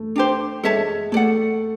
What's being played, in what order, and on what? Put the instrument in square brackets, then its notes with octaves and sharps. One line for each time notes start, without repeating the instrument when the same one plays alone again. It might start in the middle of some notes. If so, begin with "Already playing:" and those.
Already playing: [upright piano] A3
[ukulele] D4 G4 C5
[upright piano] G#3 [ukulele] A4 C#5 E5 A5
[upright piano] A3 [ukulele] A4 D5 F#5